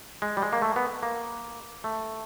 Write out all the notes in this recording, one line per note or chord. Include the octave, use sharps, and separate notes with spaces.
G#3
G3
G#3
A#3
A3
B3
A#3
A3